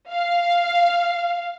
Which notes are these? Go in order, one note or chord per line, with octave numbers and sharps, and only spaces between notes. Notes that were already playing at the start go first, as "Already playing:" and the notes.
F5